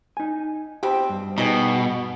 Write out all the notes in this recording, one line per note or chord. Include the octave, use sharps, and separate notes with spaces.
D#4 G#5
B2 B3 C4 G4
G2
B2 D#4 G4 G#4